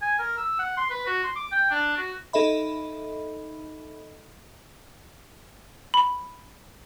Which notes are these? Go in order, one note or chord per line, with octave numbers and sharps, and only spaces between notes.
G#5
A#4
E6
F#5
C6
B4
F#4
C6
D6
G5
D4
F#4
D#4 A4 D#5 E5 B5
B5